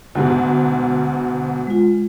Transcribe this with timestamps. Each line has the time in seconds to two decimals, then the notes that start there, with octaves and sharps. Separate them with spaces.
0.15 D2 G#2 B2
1.67 G#3 F4